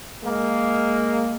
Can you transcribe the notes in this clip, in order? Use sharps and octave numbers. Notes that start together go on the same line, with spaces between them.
G#3 A#3